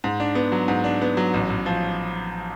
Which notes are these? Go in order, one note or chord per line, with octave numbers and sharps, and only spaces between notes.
G#2
D4
B3
F#3
G#2
D4
B3
F#3
A1
A1
F3